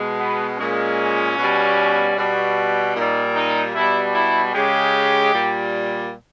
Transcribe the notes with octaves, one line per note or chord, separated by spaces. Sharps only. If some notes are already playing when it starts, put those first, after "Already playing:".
Already playing: B2 G#3
B3
A#2 G#3 C#4
B2 G3
B2 G3
A#2 G3 D#4
D#4
B2 G3 E4
E4
C#3 G#3 G4
A#2 G3